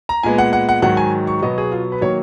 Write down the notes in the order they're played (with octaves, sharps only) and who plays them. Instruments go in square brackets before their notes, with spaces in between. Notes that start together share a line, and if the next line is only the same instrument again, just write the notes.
[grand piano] A#5
A#2 G#3 B3 G#5
F#5
F#5
F#5
G#2 D#3 F#3 F#5
G#5
C#6
B2 F#3 B3 D#5
G#4
F4
B4
D#3 F#3 A#3 C#5